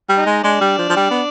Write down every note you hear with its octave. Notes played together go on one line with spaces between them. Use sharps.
G3
D#4
G#3
G#3 D4
G3
F3
F3
G3
B3